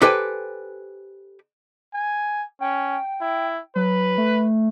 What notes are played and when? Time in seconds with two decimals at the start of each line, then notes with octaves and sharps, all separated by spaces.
0.02 G4 A4 B4 C5 G5 G#5
1.94 G#5
2.61 C#4 G5
3.21 E4
3.76 F#3 B4
4.18 A3